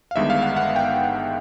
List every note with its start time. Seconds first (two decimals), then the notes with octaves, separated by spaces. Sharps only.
0.11 F5
0.16 G1 G2 D#3 G#3 B3 E5
0.30 F5
0.42 F#5
0.56 F#5
0.76 G5